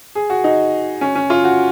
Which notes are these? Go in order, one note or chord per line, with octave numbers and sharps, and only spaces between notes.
G#4
F#4
D#4
C#4
C#4
F4
F#4